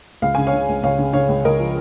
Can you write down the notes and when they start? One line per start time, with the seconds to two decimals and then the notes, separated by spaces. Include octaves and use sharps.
0.22 C#2 F5
0.35 C#3 G#5
0.47 C#5 F5
0.53 C#3
0.68 C#2
0.83 C#2 C#5 F5
0.99 C#3
1.13 C#3 C#5 F5
1.29 C#2
1.44 C#2 A#4 D#5
1.59 F3